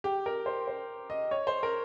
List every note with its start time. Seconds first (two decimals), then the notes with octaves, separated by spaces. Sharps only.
0.04 G4
0.26 A#4
0.46 C5
0.68 C5
1.10 D#5
1.31 C#5
1.47 C5
1.63 A#4